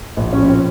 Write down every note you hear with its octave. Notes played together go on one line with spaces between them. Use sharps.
A#1
C#4
F3
C#4
C4